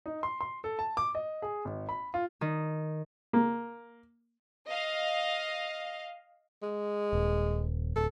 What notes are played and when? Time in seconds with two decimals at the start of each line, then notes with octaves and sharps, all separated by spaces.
0.06 D#4
0.23 C6
0.41 C6
0.64 A4
0.79 A5
0.97 D6
1.15 D#5
1.42 G#4
1.65 G#1
1.89 B5
2.14 F4
2.41 D#3
3.33 A#3
4.69 D#5 F5
6.62 G#3
7.13 D#1
7.96 D1 A4